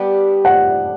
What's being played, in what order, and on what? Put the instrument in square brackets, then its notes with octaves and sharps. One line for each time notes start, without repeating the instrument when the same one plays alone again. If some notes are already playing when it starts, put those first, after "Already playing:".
Already playing: [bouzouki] G3 B3 D4 G4
[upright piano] F#5